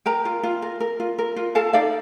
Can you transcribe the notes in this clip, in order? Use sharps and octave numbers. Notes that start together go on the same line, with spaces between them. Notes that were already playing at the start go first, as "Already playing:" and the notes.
A#4 G5 A#5
F4
F4
A#4
A#4
F4
A#4
F4
A4 F5 A5
D#4 D5 F5